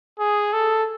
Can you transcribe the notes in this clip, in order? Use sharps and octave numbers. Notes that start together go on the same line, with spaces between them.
G#4
A4